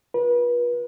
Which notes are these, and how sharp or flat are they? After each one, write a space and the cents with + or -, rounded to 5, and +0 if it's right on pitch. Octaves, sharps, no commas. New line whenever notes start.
F4 +20 B4 -35